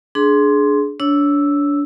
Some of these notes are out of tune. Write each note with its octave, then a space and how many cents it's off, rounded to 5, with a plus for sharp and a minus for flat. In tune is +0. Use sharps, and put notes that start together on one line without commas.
D4 +0 G#4 +20 C6 +0
D4 -30 C#5 +0 E6 +0